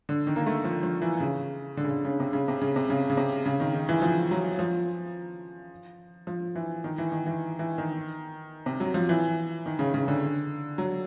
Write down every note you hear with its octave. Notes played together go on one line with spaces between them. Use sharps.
D3
D#3
A#3
A3
F3
F3
E3
C#3
D3
C#3
D3
C#3
C3
C#3
C3
C#3
C3
C#3
C#3
C3
C#3
D#3
D#3
E3
F3
F#3
F3
F3
E3
D#3
E3
D#3
E3
E3
D#3
C3
F#3
F3
E3
D#3
C#3
C#3
D3
F#3